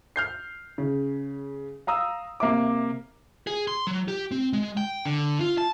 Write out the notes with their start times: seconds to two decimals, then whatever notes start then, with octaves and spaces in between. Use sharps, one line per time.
0.16 F6 G6 C7
0.78 C#3
1.87 F5 A#5 D#6 E6
2.40 C3 A#3 E5 D6
3.47 G#4
3.67 C6
3.87 F#3
4.08 G4
4.31 C4
4.53 G#3
4.77 G5
5.05 D3
5.40 F4
5.58 A5